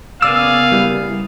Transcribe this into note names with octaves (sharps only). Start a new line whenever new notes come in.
C#3 A#3 B3 G#4 D5 F5 D6 E6
G3 E4